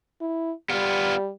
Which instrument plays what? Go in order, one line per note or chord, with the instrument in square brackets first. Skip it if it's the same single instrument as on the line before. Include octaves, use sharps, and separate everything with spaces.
[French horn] E4
[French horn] G3 [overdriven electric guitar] B3 F4